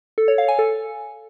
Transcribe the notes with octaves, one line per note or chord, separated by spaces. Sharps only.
A4
C#5
F5
G#5
A4